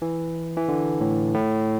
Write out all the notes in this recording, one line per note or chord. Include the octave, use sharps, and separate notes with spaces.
E3
E3
D3
A2
A2